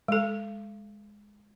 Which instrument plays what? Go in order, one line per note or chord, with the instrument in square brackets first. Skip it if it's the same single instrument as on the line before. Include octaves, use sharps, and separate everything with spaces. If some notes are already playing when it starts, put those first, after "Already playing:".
[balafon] G#3 A4